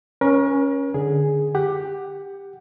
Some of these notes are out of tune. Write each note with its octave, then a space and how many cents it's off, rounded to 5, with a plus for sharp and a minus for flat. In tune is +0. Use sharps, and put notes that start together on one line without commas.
C#4 +0 A#4 +40
D3 +0 G#4 +0
G4 +10 F#5 +5